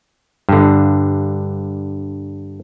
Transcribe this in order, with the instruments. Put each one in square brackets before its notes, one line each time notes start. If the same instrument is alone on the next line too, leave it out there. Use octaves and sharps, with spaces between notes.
[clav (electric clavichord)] G2 D3